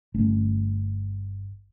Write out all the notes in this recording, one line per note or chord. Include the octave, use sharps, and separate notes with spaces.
G1 A3 C#4